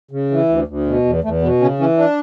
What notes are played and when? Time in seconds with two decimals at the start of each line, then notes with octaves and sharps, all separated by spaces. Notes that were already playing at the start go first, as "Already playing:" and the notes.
0.11 C#3
0.31 E3
0.49 D2
0.67 D2
0.86 B2
1.05 E2
1.24 E2 A3
1.42 B2 B3
1.61 C#3 C#4
1.79 E3 C#4
1.97 D4